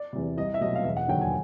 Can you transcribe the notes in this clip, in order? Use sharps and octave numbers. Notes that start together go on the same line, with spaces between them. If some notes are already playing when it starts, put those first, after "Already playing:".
Already playing: D5
E2 C3
C2 D#5
E5
B2 F#3 A3 D#5
F5
E1 E5
F#5
D#2 D3 F#3 G5
G#5